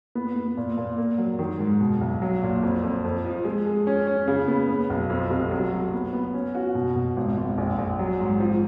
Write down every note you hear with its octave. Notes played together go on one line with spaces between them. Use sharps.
B3
B3
A#2
A#2
A#3
F#3
D#3
G#2
B2
B1
F#3
A#2
F2
F2
F2
F3
G#3
G#3
C#4
C#4
C#3
B3
B3
B1
F2
F1
F#3
F#3
B3
B3
C#4
F#4
B2
B2
G#1
G#1
A#1
A#1
F#3
G#2
F3